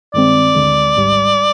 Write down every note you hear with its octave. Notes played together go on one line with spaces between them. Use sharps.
G2 D#3 G#3 C4 D5
D2 D3 G#3
G#1 G#2 G3